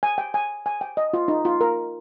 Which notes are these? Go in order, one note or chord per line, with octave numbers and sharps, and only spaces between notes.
G#5
G5
G#5
G#5
G5
D#5
F4
D#4
F4
A#4